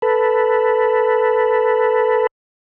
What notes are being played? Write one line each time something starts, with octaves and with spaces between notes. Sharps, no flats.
A4 B4